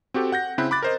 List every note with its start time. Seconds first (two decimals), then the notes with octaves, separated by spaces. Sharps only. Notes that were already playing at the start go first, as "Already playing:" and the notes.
0.14 C4 F#4 G4 A4
0.32 F#5 G6 A#6
0.58 C#3 C4 E4 B5 F#6
0.71 B5 D6 F#6 A6
0.83 A#4 C5 D#5